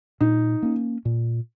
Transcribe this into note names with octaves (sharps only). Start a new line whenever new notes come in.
A#2 D#4
A#3 C#4
A#2